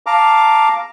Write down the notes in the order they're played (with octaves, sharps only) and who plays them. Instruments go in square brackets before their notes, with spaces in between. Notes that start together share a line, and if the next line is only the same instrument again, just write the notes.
[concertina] F5 A5 A#5 D6